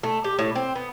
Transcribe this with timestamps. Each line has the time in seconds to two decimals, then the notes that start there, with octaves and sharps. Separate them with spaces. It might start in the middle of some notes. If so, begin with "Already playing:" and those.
0.03 A3
0.24 G4
0.39 A2
0.55 C4
0.75 B3